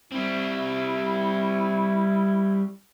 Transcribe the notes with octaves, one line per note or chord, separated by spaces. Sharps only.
G3 C4 E4